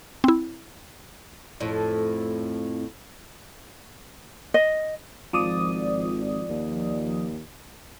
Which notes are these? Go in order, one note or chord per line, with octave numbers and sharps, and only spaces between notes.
C4 E4
F2 A2
D#5
G#1 F3 D5 D#6
D#2